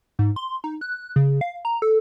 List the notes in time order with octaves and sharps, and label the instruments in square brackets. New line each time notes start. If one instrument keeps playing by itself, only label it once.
[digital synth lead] G#2
C6
D#4
F#6
C#3
F5
A#5
A4